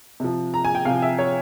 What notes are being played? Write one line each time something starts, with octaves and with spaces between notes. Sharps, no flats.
C3 F3
A#5
G#5
G5
C3 F3 F5
E5
C#5